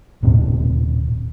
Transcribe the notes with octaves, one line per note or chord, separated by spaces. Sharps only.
D#1 A2 C3